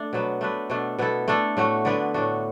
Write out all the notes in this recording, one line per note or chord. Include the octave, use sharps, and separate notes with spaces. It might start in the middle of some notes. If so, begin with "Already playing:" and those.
Already playing: A3 D4
B2 F#3 B3
A3 D4 B4
B2 A3 D4
B2 B3 E4 A4
A3 D4 A4
A2 A3 F#4
D3 B3 D4 B4
A2 A3 D4 F#4